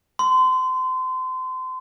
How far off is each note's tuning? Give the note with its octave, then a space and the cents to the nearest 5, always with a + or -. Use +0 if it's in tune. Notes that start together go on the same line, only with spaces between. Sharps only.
C6 -30